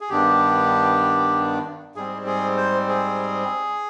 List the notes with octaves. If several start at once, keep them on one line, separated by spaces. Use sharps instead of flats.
G#4
G2 D#3 B3 D4 G4
G#2 G3 C4 G#4
G#4
C5
G#4